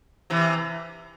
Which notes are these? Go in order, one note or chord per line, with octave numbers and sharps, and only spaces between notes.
C3 E3